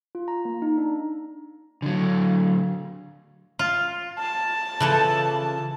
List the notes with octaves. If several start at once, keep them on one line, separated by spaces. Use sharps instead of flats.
F4
A#5
A#3
D#4
D4
D3 F#3
F4
A5
C#3 E3 F3 A4